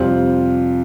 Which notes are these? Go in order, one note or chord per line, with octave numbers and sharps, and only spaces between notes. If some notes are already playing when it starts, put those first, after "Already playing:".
Already playing: F2 C3 G3 F4 C5